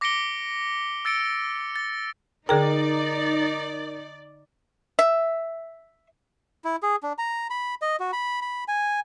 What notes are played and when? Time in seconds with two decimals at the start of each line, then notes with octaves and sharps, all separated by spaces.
0.01 D6 A#6 B6 C#7 D7 G7
1.05 E6 A6 C#7 D7
1.76 A6
2.49 D3 D#4 G#4 A#4 D5 G5
4.99 E5
6.64 E4
6.83 G#4
7.03 D4
7.18 A#5
7.50 B5
7.82 D#5
8.00 F#4
8.13 B5
8.42 B5
8.68 G#5